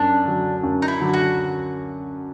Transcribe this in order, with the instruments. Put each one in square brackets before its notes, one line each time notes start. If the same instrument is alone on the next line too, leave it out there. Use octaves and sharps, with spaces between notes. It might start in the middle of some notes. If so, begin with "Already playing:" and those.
Already playing: [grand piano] F#2 [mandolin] D4
[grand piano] D3 F#3
F#2
[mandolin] D#4
E4
[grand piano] D3 F#3
[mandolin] F#4